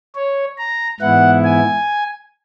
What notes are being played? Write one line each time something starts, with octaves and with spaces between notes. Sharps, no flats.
C#5
A#5
G#2 E3 B3 E4 F#5
G#5